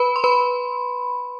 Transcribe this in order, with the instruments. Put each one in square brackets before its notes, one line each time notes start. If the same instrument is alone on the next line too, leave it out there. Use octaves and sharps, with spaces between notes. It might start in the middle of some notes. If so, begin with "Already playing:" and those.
Already playing: [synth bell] B4 B5
C6
B4 B5